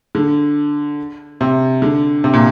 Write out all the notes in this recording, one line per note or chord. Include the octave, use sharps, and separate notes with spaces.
D3
C3
D3
C3
A#2